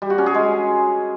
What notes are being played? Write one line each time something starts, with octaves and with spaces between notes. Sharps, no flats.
G3
F#4
C#4
G#4
G#3